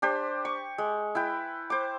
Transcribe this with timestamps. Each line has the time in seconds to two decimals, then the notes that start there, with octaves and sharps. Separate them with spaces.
0.02 D4 G4 C5
0.45 C#6
0.78 G#3
1.15 E4 B4 G5
1.70 C5 D6